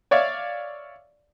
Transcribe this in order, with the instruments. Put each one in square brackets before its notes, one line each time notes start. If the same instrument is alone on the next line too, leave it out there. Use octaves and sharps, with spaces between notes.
[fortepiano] C#5 D5 E5 F5